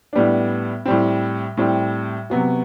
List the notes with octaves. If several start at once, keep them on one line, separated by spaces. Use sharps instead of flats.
A2 G3 B3 D4
A2 G3 C4
A2 G3 C4
C3 F#3 B3 F#4